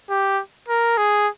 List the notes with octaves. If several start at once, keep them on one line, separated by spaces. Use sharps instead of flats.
G4
A#4
G#4